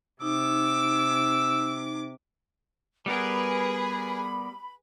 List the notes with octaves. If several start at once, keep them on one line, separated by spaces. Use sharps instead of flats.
C3 D#4 D6 E6
G3 B3 G#4 A#4 B4 B5